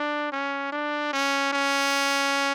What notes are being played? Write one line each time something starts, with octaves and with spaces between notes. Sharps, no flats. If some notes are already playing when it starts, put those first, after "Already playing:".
Already playing: D4
C#4
D4
C#4
C#4